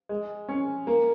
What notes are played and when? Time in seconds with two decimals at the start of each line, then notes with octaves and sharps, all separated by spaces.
0.09 G#3
0.49 C#4
0.87 A#3